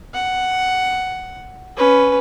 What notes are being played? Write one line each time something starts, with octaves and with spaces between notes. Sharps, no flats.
F#5
C#4 B4